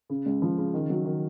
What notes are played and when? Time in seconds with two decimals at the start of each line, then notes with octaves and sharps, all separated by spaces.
0.10 C#3
0.26 C#2
0.42 F3
0.58 C#3
0.74 D#3
0.90 F#3
1.05 D#3